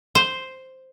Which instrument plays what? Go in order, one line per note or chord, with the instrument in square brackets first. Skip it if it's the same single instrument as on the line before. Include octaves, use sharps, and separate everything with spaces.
[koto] C5